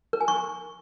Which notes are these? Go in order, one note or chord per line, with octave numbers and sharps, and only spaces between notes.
A#4
G#5
C#6